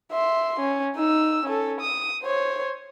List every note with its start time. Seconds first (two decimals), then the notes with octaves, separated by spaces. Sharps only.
0.12 E5 C6
0.60 C#4
0.96 D#4 E6
1.45 C#4 A4
1.81 D#6
2.23 C5 C#5